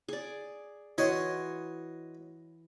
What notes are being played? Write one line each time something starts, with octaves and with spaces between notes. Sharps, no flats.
G#4 D5
E3 F#4 C#5 D#5 C6